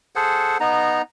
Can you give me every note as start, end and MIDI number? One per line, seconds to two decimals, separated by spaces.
0.16 0.58 68
0.16 0.58 69
0.16 0.58 72
0.16 0.58 78
0.60 1.02 59
0.60 1.02 63
0.60 1.02 82